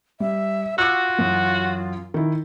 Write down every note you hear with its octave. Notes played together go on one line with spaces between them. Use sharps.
G3 E5
F4 F#4 D6 E6
F#2 E3 F#3
D#3 E4